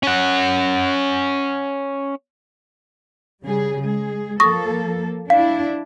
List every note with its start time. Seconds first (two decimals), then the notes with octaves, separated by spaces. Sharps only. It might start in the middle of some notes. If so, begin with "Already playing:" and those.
0.03 C#4 F#5
3.44 C#3 G3 G#4
3.83 G#3 G#4
4.40 F3 A#3 A4 C#6 D#6 A#6
5.30 D4 E4 F5